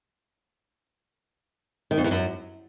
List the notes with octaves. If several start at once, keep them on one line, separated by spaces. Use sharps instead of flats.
D#3
F2
E2
F#2